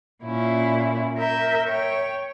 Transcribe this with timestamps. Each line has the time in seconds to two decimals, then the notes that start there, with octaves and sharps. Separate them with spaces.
0.23 A#2 C#4 E4
1.16 A#4 E5 G6
1.66 C#5 G5